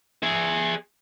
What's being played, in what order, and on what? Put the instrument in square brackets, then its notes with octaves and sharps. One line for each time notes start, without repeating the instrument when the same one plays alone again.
[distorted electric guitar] G#4 E5